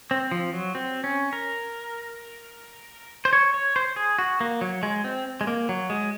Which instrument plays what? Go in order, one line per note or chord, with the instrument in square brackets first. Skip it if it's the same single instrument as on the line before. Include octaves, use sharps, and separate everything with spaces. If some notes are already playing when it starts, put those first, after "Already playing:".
[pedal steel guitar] C4
F3
F#3
C4
C#4
A#4
C5
C#5
C#5
C5
G#4
F#4
A#3
F#3
G#3
C4
G#3
A#3
F#3
G#3